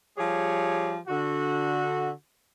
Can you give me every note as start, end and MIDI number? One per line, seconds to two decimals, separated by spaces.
0.18 0.97 53
0.18 0.97 55
0.18 0.97 67
0.18 0.97 68
0.18 0.97 73
1.07 2.11 50
1.07 2.11 66